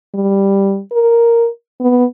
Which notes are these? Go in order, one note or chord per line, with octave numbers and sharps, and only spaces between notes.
G3
A#4
B3